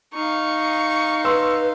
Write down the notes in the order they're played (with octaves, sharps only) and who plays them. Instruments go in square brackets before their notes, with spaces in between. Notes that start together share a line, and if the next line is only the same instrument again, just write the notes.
[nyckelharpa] D#4 F5 [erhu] C#6
[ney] B4 [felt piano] C6 E6